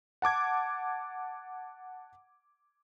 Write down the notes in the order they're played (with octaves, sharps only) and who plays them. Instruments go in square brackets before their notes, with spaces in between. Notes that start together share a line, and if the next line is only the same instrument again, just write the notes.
[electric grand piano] F#5 A5 D6 G#6